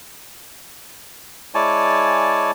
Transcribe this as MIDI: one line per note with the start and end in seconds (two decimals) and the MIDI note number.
1.54 2.51 56
1.54 2.51 64
1.54 2.51 73
1.54 2.51 74
1.54 2.51 80
1.54 2.51 81